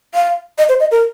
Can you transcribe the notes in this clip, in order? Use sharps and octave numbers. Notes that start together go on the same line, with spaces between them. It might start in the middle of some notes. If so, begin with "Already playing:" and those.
F5
D#5
C5
D#5
A#4